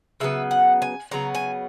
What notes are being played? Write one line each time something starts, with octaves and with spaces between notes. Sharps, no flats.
C#3 F#3 B3 E5
F#5
G#5
C#3 F#3 B3 A#5
G#5